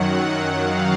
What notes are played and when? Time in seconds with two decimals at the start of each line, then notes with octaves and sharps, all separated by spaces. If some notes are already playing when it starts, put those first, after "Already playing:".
Already playing: F#2 D#3 F#3 F#5
0.56 F5